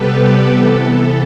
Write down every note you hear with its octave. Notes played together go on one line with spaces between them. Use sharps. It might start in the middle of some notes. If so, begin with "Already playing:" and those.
Already playing: C3 G3 B3 G4 A4 B4
G4
C3 E3 B3 A4